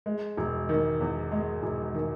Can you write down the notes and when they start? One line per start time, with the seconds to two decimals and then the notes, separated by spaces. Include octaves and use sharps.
0.06 G#3
0.37 E1
0.69 D#3
1.00 E2
1.32 G#3
1.63 E1
1.94 D#3